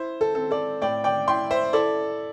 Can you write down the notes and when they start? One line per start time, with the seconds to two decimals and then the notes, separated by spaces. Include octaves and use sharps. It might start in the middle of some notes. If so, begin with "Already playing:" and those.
Already playing: E4 C5
0.21 A4
0.35 C4 A4
0.51 A4 D5
0.82 A2 D5 G5
1.04 D5 G5
1.27 E4 G5 C6
1.51 C5 E5
1.73 E4 A4 D5